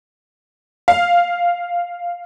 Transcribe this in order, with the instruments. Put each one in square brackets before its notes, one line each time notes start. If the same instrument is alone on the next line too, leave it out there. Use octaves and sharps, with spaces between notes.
[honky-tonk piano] F5